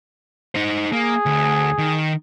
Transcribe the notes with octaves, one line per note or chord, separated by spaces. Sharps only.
D#4 C5
A#3 G#4
D2
D#3